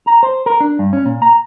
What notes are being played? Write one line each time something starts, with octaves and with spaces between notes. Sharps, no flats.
A#5
C5
A#4
D4
G2
C#4
A#2
A#5